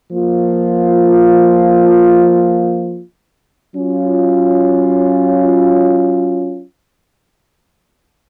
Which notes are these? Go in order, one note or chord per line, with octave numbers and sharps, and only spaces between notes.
F3 A#3 F4
F#3 C#4 F4